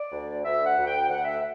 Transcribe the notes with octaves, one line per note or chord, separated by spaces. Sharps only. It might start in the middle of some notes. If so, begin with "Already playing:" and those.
Already playing: D5
D2
D2 E5
F#5
D2
G5
D2 F#5
E5